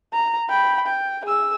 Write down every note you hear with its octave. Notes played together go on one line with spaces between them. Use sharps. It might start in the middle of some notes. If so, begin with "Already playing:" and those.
A#5
G5 B5
G5
G#4 E6